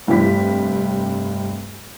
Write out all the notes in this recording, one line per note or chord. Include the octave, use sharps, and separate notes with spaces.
F1 G2 C3 G4 B6